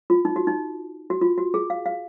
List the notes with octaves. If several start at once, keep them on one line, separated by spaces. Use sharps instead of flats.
F4
D#4
F#4
D#4
F#4
F4
F#4
G#4
F5
F5